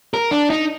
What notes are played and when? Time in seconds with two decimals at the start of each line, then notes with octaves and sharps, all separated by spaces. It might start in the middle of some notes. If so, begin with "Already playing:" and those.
0.14 A#4
0.31 D4
0.50 D#4